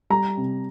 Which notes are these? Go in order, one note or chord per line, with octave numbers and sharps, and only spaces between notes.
G3 A#5
C3